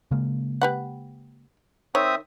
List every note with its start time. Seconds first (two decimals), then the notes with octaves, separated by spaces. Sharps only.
0.11 C#3 G#3 A#3
0.61 G4 B4 F#5
1.95 D#3 C4 C#5 E5 D#6